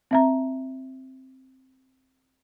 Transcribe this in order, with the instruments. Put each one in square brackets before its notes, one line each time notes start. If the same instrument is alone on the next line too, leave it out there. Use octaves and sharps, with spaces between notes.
[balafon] C4 E5 A#5